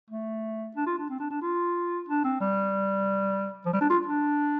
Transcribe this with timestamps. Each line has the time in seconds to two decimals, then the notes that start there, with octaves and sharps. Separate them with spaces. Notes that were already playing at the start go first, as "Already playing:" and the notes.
0.10 A3
0.76 D4
0.86 F4
0.98 D4
1.09 C4
1.20 D4
1.30 D4
1.42 F4
2.08 D4
2.24 C4
2.41 G3
3.66 F3
3.73 G3
3.81 D4
3.90 F4
4.06 D4